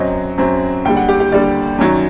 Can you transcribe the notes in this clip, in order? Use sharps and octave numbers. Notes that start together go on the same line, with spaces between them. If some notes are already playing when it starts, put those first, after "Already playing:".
Already playing: F#2 F#3 C4 D#5
F#2 F#3 C4
D#2 D3 G3 G5
F#5
G4
G4
D#2 D3 G3 D5
F#2 D#3 F#3